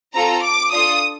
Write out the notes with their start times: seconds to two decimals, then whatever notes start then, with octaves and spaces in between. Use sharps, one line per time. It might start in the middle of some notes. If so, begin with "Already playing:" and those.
0.15 C4 F4 A4 A#5
0.43 D6
0.72 D4 F4 A4 D#6